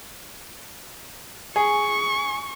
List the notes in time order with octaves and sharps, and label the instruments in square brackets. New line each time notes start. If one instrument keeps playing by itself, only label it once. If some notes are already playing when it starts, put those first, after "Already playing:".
[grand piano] G#4 [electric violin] C#6